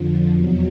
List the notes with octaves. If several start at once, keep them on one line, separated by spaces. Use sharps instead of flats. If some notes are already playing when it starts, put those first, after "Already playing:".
Already playing: F2 D3 F3
E2 B2 F#3